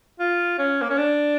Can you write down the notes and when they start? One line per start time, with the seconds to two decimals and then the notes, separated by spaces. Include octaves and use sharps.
0.20 F4
0.59 C#4
0.82 A#3
0.90 C#4
0.98 D4